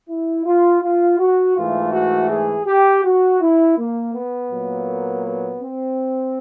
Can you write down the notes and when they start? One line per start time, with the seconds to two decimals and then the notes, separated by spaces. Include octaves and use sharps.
0.09 E4
0.45 F4
0.82 F4
1.19 F#4
1.56 G#2 E3 A3 F4
1.93 F#4
2.30 G#4
2.67 G4
3.04 F#4
3.41 E4
3.78 A#3
4.14 B3
4.51 A#2 F#3 A#3
5.25 B3
5.61 C4